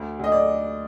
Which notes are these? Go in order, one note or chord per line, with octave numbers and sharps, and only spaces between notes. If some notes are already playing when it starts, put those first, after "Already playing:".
Already playing: D2
D2 D#5
D5